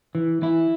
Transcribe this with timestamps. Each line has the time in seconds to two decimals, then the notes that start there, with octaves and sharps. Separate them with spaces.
0.15 E3
0.42 E3 E4